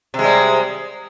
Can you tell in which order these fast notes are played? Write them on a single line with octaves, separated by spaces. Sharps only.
C3 G#3 G3